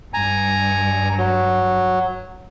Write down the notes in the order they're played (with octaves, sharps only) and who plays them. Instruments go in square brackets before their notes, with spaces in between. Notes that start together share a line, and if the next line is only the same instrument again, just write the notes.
[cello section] G2 [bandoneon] G#5 A#5
[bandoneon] F#3